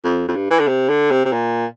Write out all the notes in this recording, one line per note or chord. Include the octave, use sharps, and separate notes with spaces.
F2
F2
G2
E3
D3
C3
D3
C3
C3
A#2